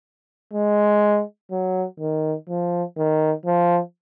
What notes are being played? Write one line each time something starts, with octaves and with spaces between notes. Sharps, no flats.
G#3
F#3
D#3
F3
D#3
F3